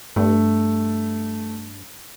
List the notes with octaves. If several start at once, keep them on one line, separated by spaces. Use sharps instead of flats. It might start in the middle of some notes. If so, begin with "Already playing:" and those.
G2 A3